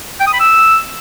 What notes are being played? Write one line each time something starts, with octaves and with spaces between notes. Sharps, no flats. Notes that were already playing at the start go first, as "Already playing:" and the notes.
G5
D#6
B5
E6